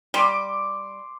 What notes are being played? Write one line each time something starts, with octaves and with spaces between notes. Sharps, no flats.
G3 C6 D6